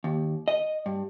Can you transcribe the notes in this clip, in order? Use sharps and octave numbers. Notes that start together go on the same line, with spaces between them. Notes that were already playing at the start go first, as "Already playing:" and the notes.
D#2
D#5
G2